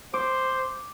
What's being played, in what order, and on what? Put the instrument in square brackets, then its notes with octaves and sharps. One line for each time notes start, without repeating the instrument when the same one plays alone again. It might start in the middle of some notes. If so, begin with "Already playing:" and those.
[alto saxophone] C5 [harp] D6